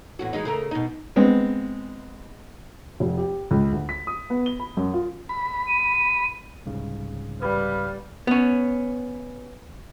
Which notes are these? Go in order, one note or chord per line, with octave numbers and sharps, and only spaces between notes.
E2 A2 F#4
E3 G#3 D#4
C#3 A3 A#4
B2 D#4
G#3 B3 C4
F1
G4
C#2
D2
B6
D#6
B3
G7
B5
F#2
F4
B5
D#7
C2 G#2 C#3
G3 B4 F5
B3 C#4